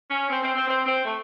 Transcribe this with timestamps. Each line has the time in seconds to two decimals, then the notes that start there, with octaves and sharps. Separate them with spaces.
0.11 C#4
0.30 C4
0.42 C4
0.55 C4
0.68 C4
0.86 C4
1.05 A3